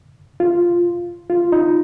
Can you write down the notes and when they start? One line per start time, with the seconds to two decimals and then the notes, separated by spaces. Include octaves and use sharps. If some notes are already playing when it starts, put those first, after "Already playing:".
0.40 F4
1.30 F4
1.52 D#4